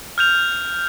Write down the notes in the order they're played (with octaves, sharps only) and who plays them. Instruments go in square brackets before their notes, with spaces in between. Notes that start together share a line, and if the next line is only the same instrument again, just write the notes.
[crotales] F6 G6 F7